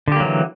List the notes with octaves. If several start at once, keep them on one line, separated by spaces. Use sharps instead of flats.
D3 E3 F#3 A#3 G4